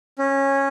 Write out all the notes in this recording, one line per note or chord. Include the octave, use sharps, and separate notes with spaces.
C#4